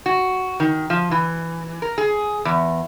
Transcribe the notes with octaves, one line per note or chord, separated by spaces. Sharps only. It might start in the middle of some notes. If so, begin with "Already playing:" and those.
F#4
D#3
F3
E3
A#4
G#4
E2